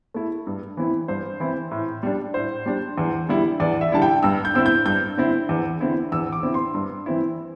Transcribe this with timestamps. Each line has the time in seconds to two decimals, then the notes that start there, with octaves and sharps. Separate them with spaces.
0.14 A3 E4
0.47 G2
0.77 E3 C4 E4
1.08 G2 C5
1.40 E3 C4 E4
1.71 A2
2.03 G3 D4
2.34 A2 C5
2.66 G3 D4
2.98 E2
3.29 D3 G3 E4
3.60 E2 D5
3.81 E5
3.92 D3 G3 E4 A5
4.02 G5
4.23 G2 E6
4.45 G6
4.54 D3 C4 E4 E6
4.66 G6
4.86 G2 G6
5.17 D3 C4 E4
5.49 E2
5.81 D3 C4 E4
6.12 E2 E6
6.32 D6
6.43 D3 C4 E4
6.54 C6
6.74 G2
7.06 E3 C4 E4